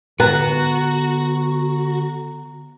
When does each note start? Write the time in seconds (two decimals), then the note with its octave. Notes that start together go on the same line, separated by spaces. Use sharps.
0.20 D3 B3 F#4 A#5